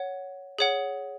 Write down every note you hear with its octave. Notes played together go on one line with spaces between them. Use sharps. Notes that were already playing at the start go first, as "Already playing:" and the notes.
Already playing: C#5 F#5
G#4 C#5 F#5